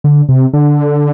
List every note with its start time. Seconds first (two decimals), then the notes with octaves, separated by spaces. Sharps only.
0.04 D3
0.29 C3
0.53 D3